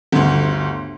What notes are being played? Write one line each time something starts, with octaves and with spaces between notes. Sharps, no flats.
G1 D2